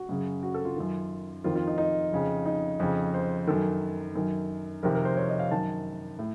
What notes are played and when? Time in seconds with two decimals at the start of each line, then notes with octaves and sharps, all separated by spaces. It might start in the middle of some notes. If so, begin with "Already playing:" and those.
Already playing: F#4
0.09 F#2 C#3
0.43 F#4
0.54 A4
0.65 F4
0.76 F#2 D#3
1.44 F2 D#3 F4
1.55 F4
1.67 D#4
1.78 D#4
2.12 F2 C#3
2.46 D#4
2.80 F2 C#3
3.14 C5
3.47 F#2 D#3 A4
4.15 F#2 D#3
4.83 F2 C3 D#3 A#4
4.95 A#4
5.05 C5
5.17 C#5
5.29 D#5
5.39 F5
5.51 F#2 D#3 A5
6.19 A2